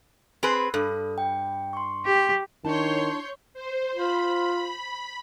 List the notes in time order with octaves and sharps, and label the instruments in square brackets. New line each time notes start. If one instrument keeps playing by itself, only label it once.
[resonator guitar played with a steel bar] C4 G#4 B4
[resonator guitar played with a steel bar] G2 [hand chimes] A4
[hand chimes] G5
C6 C#6
[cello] G4
[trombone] D#3 [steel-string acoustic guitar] D4 E4 A5 [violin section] C#5 C6 G6
[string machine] C5
[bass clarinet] F4 [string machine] B5